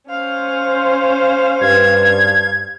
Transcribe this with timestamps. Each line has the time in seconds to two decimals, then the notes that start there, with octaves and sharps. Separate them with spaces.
0.10 C#4 C5 F5
1.61 G2 G#6